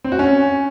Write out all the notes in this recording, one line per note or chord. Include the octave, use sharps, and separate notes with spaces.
C4
F#4
C#4